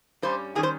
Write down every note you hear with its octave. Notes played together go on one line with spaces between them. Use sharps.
G2 G3 C#4 C5
D#3 G3 C#4 G#4
C5